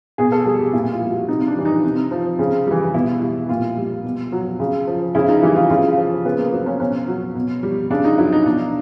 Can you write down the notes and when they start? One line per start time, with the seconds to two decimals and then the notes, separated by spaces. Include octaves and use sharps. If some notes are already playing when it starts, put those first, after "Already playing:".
0.18 B2 G#4
0.32 A4
0.46 G3 G#4
0.59 G4
0.73 A#2 E4
0.92 F4
1.01 G3
1.10 F#4
1.28 C3 D#4
1.47 D4
1.56 E3 G3
1.65 D#4
1.84 C3
2.11 F3
2.39 C#3
2.67 E3 G3
2.94 B2 E4
3.22 G3
3.49 A#2 F4
3.77 G3
4.04 B2
4.32 F#3
4.59 C#3
4.87 F3
5.15 C#3 E4
5.29 D#4
5.42 E3 G3 E4
5.56 F4
5.70 C#3 F4
5.97 F3
6.25 C#3 B3
6.39 A#3
6.52 F#3 C4
6.66 C#4
6.80 B2 C#4
7.08 F#3
7.35 B2
7.63 G3
7.90 C#3 D4
8.04 D#4
8.18 F#3 E4
8.32 D#4
8.45 B2 D4